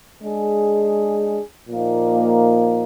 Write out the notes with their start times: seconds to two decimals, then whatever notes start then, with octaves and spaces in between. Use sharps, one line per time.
0.23 G#3 D4 G#4
1.69 A#2 F3 A#3 D#4